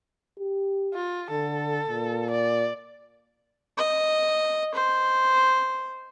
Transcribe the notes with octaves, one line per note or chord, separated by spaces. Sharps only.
G4
F4
D3 A4
A#2
D5
D#5
C5